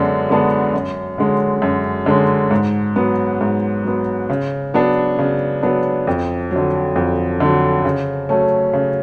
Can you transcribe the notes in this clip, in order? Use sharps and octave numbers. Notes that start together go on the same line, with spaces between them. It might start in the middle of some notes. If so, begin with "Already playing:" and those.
Already playing: F#2 D3 G#3 B3 D4
D3 G#3 B3 D4
F#2
D3 G#3 C#4
F#2
D3 G#3 C#4
G#2
F#3 B3
G#2
F#3 B3
C#3
F#3 B3 D4
C#3
F#3 B3 D4
F2
D3 F#3
F2
D3 F#3
C#3
F#3 A3 C#4
C#3